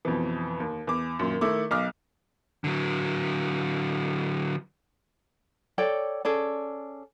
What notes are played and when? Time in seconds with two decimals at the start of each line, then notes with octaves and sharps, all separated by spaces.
0.05 F2 B2 E3
0.60 D#2
0.87 E2 D6
1.19 F#2 A#2 D#3
1.41 D#3 A3 E4 D6
1.71 B1 D#5 D6 F6
2.64 D3 F#3
5.78 A4 C#5 D5 G5
6.25 C#4 G#4 A4 D5